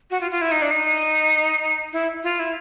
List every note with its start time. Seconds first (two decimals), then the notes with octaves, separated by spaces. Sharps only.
0.11 F#4
0.21 F4
0.31 F4
0.42 E4
0.52 D#4
0.62 D4
0.71 D#4
1.93 E4
2.23 F4
2.39 E4